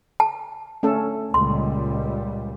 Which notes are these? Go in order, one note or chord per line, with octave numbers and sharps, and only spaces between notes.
A5
A3 C#4 A4
C#2 A#2 G3 C6